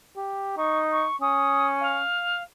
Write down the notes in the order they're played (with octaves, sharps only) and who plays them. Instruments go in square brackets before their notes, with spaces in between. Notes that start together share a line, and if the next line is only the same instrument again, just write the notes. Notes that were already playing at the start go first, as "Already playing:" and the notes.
[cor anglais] G4
[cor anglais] D#4 [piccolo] C#6
[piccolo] C#6
[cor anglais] C#4 [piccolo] D#6
[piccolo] F5